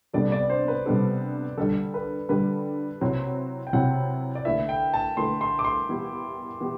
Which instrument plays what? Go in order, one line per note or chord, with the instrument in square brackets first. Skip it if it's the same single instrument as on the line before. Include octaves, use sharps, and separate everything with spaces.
[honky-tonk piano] C3 G3 B3 D4 A4 [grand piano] D5
[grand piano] D5
C5
B4
[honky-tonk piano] C3 G3 B3 D4 A4
[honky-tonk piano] D3 G3 D4 [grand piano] A4
[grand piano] B4
[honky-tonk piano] D3 G3 D4 [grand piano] B4
[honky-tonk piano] C3 F#3 C4 E4
[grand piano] G5
[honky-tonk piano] C3 F#3 C4 E4 [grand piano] F#5
[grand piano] D5
[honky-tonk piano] D3 A3 E4 B4 [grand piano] E5
[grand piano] G5
A5
[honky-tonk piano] D3 A3 E4 B4 [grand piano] C6
[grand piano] C6
D6
C6
[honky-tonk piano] E3 B3 E4 G4
E3 B3 E4 G4